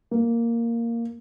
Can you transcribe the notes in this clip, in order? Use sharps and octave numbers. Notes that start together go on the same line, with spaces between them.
A#3